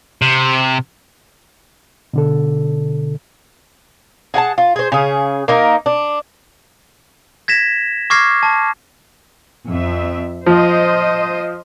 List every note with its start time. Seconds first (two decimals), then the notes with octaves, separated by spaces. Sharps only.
0.22 C3
2.14 B2 D3 A4
4.34 G#4 F#5 G#5 A5
4.58 F4
4.76 G#4 C5
4.92 C#3 G#4
5.48 A#3 D#4 A#4
5.86 D4
7.48 G#6 A#6 B6 E7
8.10 C#6 D6 F6 G#6 A#6 C7
8.43 A5
9.68 F2 E5
10.46 F3 C5 D#5